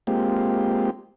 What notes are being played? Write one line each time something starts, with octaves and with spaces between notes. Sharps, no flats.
G#3 A#3 C4 F4 G4